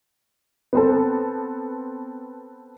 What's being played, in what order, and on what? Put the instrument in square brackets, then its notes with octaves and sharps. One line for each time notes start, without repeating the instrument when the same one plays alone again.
[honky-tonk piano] B3 C4 A4